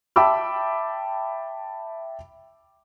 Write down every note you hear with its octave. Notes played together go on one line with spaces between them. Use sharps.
E5 G5 A5 B5 D6 E6